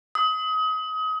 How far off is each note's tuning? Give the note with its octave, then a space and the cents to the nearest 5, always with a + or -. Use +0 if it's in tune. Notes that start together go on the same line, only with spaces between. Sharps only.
D#6 +30